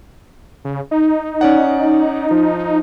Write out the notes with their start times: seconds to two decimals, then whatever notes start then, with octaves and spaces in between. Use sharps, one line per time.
0.65 C#3
0.91 D#4
1.41 C#4 D5 F#5
2.31 F3